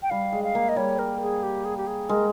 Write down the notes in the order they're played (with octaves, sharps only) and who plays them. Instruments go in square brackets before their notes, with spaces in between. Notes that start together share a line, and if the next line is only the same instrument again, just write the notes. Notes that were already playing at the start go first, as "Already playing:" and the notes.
[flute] G5
[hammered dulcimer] G3 [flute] F5
[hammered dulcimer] G#3
[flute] F5
[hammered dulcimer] A#3
[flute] D#5
[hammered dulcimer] G3 [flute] C#5
[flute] A#4
G#4
G4
G#4
G4
G#4
[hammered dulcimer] G#3 [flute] A#4